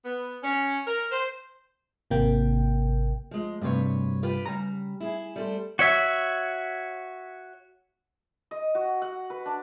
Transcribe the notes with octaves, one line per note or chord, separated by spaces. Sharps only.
B3
C#4
A#4
C5
G#1 C3 A#3 G5
F3 G#3
D2 G2 C3 B4 C#5
F4 G4 B4
C#3 G3 A#5
E4 G#4
G3 A4 C5
F#4 C#5 E5
D#5
F#4
F#5
B4
D4